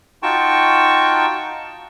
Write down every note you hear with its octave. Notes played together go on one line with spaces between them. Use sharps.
D#4 F4 F#4 G5 A5 C#6